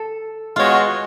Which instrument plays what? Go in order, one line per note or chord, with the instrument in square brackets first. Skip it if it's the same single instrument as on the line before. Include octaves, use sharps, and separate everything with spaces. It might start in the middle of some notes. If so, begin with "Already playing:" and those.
Already playing: [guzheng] A4
[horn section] G#3 B3 F#4 C#5 [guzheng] F4